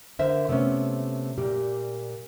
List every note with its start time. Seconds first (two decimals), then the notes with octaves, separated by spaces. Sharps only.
0.19 D3 A#4 C5 E5
0.49 C3 A3 B3 C#4
1.38 A#2 G3 G4